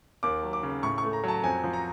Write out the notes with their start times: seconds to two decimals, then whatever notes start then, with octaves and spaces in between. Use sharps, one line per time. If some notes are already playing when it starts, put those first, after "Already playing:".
0.23 D#2 D6
0.43 F#3
0.53 D6
0.63 C#3
0.83 A2 C#6
0.98 C#6
1.04 A3
1.13 A#5
1.24 F#3 A5
1.44 F2 G#5
1.64 F3
1.73 A#5